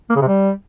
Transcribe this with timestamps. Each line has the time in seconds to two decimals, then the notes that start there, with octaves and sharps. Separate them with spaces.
0.10 A#3
0.16 C#3
0.22 C3
0.28 G3